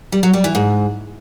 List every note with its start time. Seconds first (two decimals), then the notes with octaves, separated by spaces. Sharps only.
0.12 G3
0.23 F#3
0.33 G3
0.44 E3
0.55 G#2